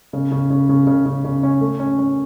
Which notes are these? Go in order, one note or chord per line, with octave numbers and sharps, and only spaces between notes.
C#3
C#3
C#3
C#3
C#3
C#3
C#3
C#4
A3
C#4
C#4